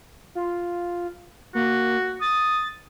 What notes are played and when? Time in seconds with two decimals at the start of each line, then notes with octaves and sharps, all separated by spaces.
0.35 F4
1.55 A#3 F#4
2.21 D#6 A6